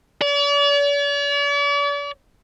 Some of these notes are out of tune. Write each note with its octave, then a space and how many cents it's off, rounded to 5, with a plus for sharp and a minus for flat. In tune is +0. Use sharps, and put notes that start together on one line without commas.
D5 -45